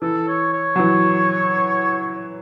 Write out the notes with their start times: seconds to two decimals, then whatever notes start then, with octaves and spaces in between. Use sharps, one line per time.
0.02 E3 A4
0.28 C#5
0.53 C#5
0.76 F#3
0.79 E3